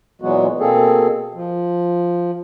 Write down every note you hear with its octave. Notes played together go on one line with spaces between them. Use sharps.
A#2 E3 F#3 G#3 B3 F#4
B2 A#3 C4 G#4 A4
F3